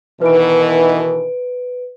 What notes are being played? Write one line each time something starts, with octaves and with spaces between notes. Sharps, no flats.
B2 D#3 E3 B4 D7